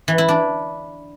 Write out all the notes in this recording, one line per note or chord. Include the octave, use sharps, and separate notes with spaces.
E3
E4
D4